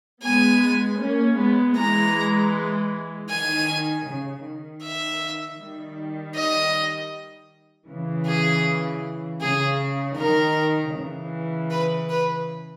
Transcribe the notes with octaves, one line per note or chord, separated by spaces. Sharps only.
G#3 B3 G#5
A#3 C#4
G#3 B3
E3 G#3 A#5
D#3 G#5
C#3
D#3
E5
D#3 G3
D#5
C#3 E3
G#4
C#3 G#4
D#3 A#4
C#3 E3
B4
B4